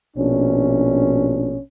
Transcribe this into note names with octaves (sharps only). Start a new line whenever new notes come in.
A#1 B2 C#4 D4